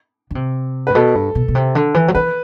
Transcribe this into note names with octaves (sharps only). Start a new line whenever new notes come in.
D3
C3
A2 B4
B2 A4
G2
B2
B2
C3
D3
E3
F#3
E3 B4